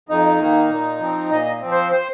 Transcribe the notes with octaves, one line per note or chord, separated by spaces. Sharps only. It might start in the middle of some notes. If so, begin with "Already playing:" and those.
F2 D#4
D#3 A#3
A#2
F3 C4
A#2 D#5
F3 C4
C5
C5